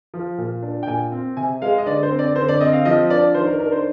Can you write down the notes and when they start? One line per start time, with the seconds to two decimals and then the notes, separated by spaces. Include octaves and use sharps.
0.14 F3
0.38 A#2
0.63 D4
0.83 G5
0.87 A#2 G#5
1.12 C4
1.37 C3 G#5
1.62 G#3 F5
1.78 D#5
1.86 D3 D5
2.03 C5
2.11 C4
2.19 D5
2.36 D3 C5
2.48 D5
2.61 C4 D#5
2.73 F5
2.85 F3 D#5
3.10 D4 D5
3.35 D#3 C5
3.47 A#4
3.60 D4 A#4
3.72 C5